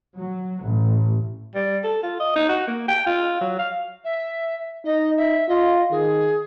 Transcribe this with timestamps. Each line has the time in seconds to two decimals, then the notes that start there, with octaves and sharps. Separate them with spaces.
0.16 F#3
0.64 A1
1.55 G3
1.84 A4
2.03 F4
2.20 D#5
2.36 D#4
2.49 F#4
2.67 A#3
2.88 G5
3.06 F4
3.41 F#3
3.59 F5
4.04 E5
4.85 D#4 D#5
5.17 E5
5.49 F4 D#5
5.91 D#3 G#4